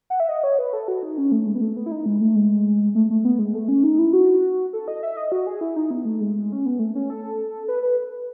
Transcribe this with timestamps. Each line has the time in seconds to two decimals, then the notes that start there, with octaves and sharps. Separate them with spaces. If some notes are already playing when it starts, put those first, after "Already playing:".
0.10 F#5
0.20 E5
0.29 D#5
0.44 C#5
0.59 B4
0.73 A4
0.88 F#4
1.03 D#4
1.18 C#4
1.32 A3
1.47 G#3
1.55 B3
1.61 A3
1.77 B3
1.86 E4
1.92 D#4
2.06 G#3
2.21 A3
2.36 G#3
2.95 A3
3.10 A3
3.25 B3
3.39 G#3
3.55 A3
3.68 C#4
3.84 D#4
3.99 E4
4.13 F#4
4.73 A4
4.88 D#5
5.03 E5
5.17 D#5
5.32 F#4
5.47 G#4
5.61 E4
5.76 D#4
5.90 B3
6.05 A3
6.21 G#3
6.52 C#4
6.66 B3
6.79 A3
6.95 C#4
7.10 A4
7.68 B4
7.83 B4